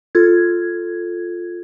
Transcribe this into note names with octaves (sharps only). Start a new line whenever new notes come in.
F4 A4 G#6